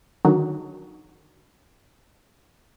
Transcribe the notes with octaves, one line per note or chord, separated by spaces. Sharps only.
D3 D#3 F#3